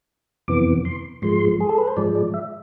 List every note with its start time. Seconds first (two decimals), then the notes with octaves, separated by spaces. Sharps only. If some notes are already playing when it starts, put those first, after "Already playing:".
0.48 F2 C3 E3 B3 D6
0.85 C6
1.22 G#2 F3 G#3 C6
1.60 G#4
1.69 A4
1.78 B4
1.88 C5
1.97 G#2 F3 G#3 D5
2.15 D5
2.34 E5